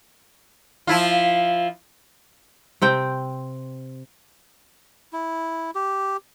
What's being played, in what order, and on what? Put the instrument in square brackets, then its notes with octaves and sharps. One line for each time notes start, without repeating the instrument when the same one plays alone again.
[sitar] F3 E4 F4
[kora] C3 C4 G5
[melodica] E4
G4